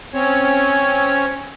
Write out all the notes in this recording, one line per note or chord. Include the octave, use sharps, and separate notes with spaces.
C4 C#4 C#5